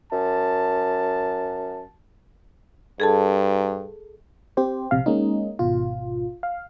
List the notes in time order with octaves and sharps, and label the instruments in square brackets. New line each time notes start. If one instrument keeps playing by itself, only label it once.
[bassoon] F#2 [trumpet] A5
[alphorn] G2 [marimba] G#4 A4 A5
[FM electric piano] C4 G4 C5
A#1 C3 F5
G#3 A#3 C#4 D#4
G#1 B2 F4
F5